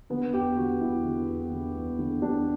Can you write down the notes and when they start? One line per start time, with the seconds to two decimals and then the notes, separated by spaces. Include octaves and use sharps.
0.10 D3 B3
0.34 E2 G4
0.57 D3 F#4
0.81 E2 E4
1.04 D3
1.29 E2
1.52 D3
1.75 E2
1.99 D3
2.22 E2 D4